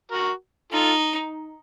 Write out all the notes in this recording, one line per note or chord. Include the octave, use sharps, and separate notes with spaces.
F#4 A#4
D#4 F4 A4